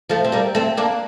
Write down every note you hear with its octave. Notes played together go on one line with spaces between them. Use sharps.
F3 A3
C4
G3 A#3
A3 C4
A#3 D4